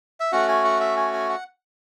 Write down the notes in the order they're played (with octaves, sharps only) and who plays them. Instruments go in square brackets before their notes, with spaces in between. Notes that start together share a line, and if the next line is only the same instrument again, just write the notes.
[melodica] E5
A3 C#4 F#4 F#5
G#5
F#5
E5
G#5
G#5
F#5